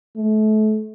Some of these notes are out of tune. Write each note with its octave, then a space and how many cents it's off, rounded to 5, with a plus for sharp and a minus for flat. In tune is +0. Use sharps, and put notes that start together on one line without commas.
A3 -30